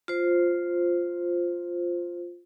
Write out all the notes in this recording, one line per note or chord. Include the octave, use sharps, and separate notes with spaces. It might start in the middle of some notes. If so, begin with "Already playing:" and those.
F4 C5